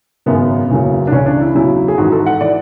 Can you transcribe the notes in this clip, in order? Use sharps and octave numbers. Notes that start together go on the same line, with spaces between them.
G#1 F#2 C#3 B3
F#1 E2 C#3 F#3
D4
C#2 C#3 E3 C#4
D4
E4
E2 C#3 F#3 E4
G#4
G#1 G#2 E3 F#4
A4
F#5
E3 D5